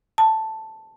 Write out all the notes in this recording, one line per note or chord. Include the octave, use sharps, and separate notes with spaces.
A5